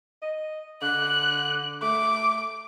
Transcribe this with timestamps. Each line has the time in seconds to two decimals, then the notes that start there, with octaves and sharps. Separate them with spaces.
0.22 D#5
0.82 D3 F#6
1.82 A3 D6